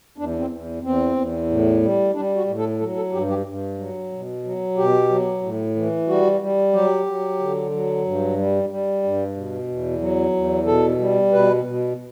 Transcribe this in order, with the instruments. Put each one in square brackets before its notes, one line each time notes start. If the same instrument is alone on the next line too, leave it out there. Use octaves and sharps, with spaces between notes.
[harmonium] E2 D4
C4
E2
E2 C4
E2
A2
G3
G3 D4
F#4
A2
A4
F#3 A4
A4
G2 G4
G4
G2
F#3
B2
F#3
B2 G4
F#3
A2
E3
G3 F#4
G3
F#3 G4
F#3
D3
F#3
G2
G3
G3
G2
B2
E2
F#3
E2
B2 A4
G3
B2 B4
B2